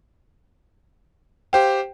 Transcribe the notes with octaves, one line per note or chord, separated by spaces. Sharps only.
G4 C5 F5 G5